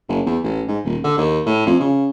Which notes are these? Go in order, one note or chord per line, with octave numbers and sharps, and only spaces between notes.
F#1
E2
A1
G#2
D#1
D3
D#2
A2
F2
C#3